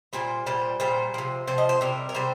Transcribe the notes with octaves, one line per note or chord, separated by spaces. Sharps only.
A#2 G3 C5
A#2 G3 C5
A#2 G3 C5
C3 F3
C3 F3 C5
D#5
C5
C3 G3 A#4
A#4
C3 G3 C5